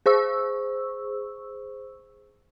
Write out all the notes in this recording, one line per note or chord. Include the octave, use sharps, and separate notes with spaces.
G#4 C5 C#6 E6